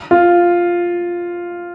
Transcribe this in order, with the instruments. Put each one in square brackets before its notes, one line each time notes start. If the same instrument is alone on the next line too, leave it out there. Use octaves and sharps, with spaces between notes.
[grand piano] F4